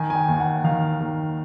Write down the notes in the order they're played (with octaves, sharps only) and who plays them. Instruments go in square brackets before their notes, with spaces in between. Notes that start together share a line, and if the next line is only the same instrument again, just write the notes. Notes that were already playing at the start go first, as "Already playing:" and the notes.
Already playing: [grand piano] D#3 G#5
G#5
G5
D#2
F#5
D#3 F5
D#2